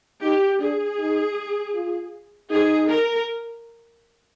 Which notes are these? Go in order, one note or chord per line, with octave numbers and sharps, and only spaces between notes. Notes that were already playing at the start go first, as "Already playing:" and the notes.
D#4 G4
D4 G#4
D#4
F4
D#4 G#4
A#4